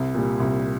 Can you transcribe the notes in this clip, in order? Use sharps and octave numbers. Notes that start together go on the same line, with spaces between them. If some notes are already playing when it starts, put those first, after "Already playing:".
Already playing: C2
A#2 G3
C2